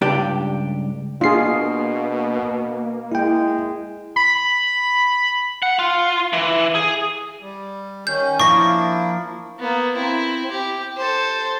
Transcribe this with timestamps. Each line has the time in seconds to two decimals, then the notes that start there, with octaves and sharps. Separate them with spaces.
0.01 C#2 G2 D4 G4
1.21 B2 A#3 D4 F4 G#4 C7
3.12 G#3 E4 G5
4.16 B5
5.63 F#5
5.79 F4
6.33 E3
6.75 G#4
7.42 G3
8.07 D#3 C#4 G6
8.40 F3 A#3 D4 E4 C#6 A#6
9.60 A#3 B3
9.96 C4 E4
10.51 G4
10.97 A4 C5